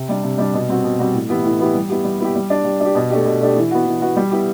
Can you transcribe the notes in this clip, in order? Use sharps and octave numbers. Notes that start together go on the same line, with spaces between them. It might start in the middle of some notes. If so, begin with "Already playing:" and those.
Already playing: C3
G3 D4
C3
G3 D4
B2
G3 C4 F#4
B2
G3 C4 F#4
A2
E3 B3 E4 G4
A2
E3 B3 E4 G4
G3
B3 E4 G4
G3
B3 E4 G4
G3
D4 G4
G3
D4 G4
B2
A3 D4 G4
B2
A3 D4 G4
E3
B3 F#4
E3
B3 F#4
G3
B3 E4 G4